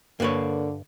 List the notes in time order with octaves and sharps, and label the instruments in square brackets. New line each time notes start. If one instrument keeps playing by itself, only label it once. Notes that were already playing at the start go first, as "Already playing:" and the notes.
[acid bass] G2 [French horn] D3 [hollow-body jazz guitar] A#3 B4 C#5